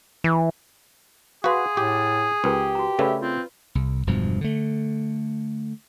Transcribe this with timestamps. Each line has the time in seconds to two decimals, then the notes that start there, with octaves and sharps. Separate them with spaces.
0.24 E3
1.44 F#4 G#4 B4 F5 F#5 C6
1.77 A2 G4 D6
2.44 C#2 G4 A#4 B4 G5
2.75 F#4 A#5
2.99 C#3 A3 B4 D5 E5 B5
3.21 C4 F4
3.75 C2
4.07 E1 G2 B2 F3
4.41 D3 A3